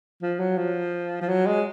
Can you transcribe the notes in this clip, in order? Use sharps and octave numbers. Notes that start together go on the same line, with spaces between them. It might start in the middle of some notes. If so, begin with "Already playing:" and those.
F3
F#3
F3
F3
F#3
G#3